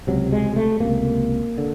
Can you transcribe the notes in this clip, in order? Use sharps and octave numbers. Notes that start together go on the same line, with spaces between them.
C#2 C3 F#3
G#3
A3
C#2 C3 A#3
D3